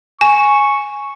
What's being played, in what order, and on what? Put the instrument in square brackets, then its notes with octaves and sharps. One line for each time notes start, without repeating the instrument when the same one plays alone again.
[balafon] G#5 [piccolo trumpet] C#6